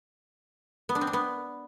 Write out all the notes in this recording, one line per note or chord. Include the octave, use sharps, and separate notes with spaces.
B3
D4
C4
D4
B3